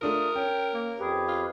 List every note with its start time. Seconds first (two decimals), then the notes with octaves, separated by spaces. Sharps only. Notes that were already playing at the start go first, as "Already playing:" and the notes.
0.02 A3 D4 F4 A#4 D#6
0.35 C#4 G5
0.74 A#3
1.00 F2 G4 G#4 B4
1.28 F4